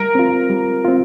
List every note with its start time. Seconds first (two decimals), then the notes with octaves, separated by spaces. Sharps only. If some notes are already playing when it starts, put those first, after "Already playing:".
Already playing: G3 A#4
0.15 C4 F4
0.50 G3
0.85 C4 F4